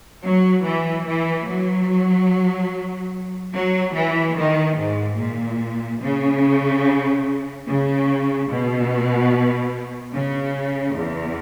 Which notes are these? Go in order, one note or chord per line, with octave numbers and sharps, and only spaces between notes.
F#3
E3
E3
F#3
F#3
E3
D#3
G#2
A#2
C#3
C#3
B2
C#3
E2